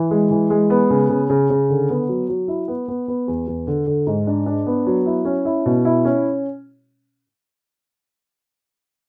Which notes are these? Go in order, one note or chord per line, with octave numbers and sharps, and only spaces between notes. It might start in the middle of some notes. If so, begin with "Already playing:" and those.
Already playing: E3
G#3
E3
G#3
B3
C#3
C#3
C#3
C#3
D3
B3
F#3
F#3
E4
B3
B3
B3
E2
E2
D3
D3
G#2
D4
D4
B3
F#3
E4
C#4
E4
B2
E4
C#4